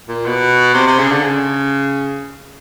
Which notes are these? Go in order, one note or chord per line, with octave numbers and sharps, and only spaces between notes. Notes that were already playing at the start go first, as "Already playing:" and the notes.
A#2
B2
C3
C3
C#3
D3
C#3